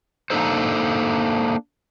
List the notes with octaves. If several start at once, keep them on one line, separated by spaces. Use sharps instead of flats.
A#3 D4 D#4 A4 C5